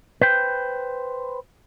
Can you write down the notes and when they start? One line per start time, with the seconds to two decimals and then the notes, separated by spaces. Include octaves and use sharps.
0.21 B4 C5 G5